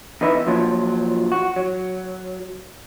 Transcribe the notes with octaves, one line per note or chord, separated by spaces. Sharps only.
E2 D#4 B4 E5
A#2 F3 F#3
F#4
F#3